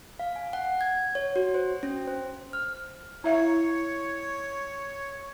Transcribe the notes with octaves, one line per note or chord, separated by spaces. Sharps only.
F5
G#5
F#5
G#6
C#5
F#4
C5
C#4
C5
F6
E4 C#5 E5 F5